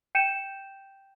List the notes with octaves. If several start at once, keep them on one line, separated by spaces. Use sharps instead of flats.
G5 G6 C#7 D#7 E7